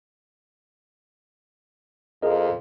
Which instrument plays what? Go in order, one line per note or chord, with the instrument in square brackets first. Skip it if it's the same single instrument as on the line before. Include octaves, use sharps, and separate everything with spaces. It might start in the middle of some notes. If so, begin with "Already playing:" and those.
[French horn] F2 [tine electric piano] G#4 A#4 D#5